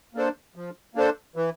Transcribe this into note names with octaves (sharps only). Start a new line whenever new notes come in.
A#3 D4 A4 C5
F3
A#3 D4 A4 C5
E3